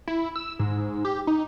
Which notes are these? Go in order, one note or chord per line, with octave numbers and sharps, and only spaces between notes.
E4
E6
G#2
G4
D#4